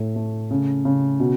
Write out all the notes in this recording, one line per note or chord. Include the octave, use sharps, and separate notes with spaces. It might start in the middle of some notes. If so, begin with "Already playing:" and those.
Already playing: A2 A3
A3
C#3
C#3
B2